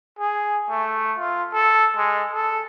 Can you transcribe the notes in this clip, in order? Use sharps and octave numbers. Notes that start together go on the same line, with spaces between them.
G#4
A3
F4
A4
G#3
A4